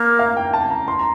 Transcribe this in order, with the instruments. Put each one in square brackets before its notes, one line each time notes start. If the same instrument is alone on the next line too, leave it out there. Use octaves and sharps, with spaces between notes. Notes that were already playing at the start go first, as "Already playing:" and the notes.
Already playing: [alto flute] A#3
[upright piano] F5
G5
A5
A#5
C6
A#5